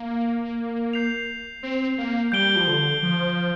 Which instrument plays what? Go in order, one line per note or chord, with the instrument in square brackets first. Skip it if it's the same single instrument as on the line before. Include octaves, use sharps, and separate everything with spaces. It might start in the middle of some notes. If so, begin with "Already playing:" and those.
Already playing: [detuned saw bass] A#3
[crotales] G6 C7 F7
[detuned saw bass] C4
A#3
[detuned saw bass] G3 [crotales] G6 D7 G7
[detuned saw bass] F3
D3
F3